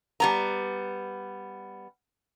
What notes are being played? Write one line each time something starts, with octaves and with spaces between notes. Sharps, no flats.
G3 B3 A#5